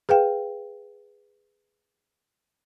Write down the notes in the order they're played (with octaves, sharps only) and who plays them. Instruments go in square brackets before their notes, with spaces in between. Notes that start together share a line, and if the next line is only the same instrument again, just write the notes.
[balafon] G#4 B4 F5 G5